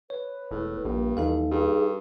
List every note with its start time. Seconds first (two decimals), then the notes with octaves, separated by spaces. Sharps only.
0.10 B4 C#5
0.51 E1 A2
0.85 A#1 G2 A#3
1.17 D#2 E3 D#4 A4 F5
1.51 G2 G#4